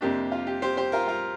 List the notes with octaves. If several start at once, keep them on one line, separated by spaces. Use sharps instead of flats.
F2 C3 A#3 D4 G4
F4
G4
G4 C5
G4 C5
F4 A#4
F4 A#4